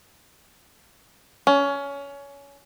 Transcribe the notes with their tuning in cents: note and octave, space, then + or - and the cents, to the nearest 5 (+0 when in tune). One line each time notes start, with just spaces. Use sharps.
C#4 +20